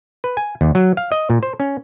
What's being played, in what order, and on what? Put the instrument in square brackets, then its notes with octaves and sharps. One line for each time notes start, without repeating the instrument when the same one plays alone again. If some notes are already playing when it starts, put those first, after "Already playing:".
[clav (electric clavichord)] B4
G#5
D#2
F#3
F5
D#5
A#2
C5
C#4